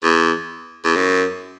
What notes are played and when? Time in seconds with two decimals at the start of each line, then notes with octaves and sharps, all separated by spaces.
0.03 E2
0.84 E2
0.96 F#2